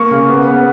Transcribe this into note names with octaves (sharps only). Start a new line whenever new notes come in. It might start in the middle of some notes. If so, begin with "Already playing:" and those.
Already playing: A#3 C#6
C#3
B3
B3